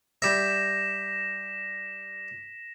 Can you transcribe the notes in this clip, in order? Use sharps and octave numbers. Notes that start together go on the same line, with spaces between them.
G3 E5 A#6 B6 E7